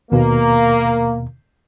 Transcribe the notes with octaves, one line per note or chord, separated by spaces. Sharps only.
D#2 B2 A#3